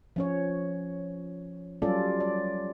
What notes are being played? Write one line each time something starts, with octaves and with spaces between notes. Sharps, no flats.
F3 C#4 C#5
F#3 G3 C#4 F4 A4 D5
D5